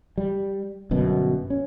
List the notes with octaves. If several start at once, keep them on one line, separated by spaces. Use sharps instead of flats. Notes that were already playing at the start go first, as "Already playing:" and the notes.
G3
G1 F#2 B2
C#4